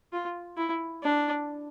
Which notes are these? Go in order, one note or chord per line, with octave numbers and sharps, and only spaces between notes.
F4
E4
D4